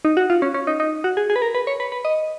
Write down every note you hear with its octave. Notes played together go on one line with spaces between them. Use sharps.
D#4
F#4
F4
C#4
C#4
D#4
D#4
F#4
G#4
G#4
B4
A#4
B4
C#5
B4
B4
D#5